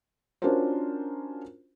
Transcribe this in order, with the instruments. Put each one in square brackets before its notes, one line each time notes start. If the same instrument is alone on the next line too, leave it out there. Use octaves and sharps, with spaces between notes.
[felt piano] C#4 D4 F4 F#4 A#4 C5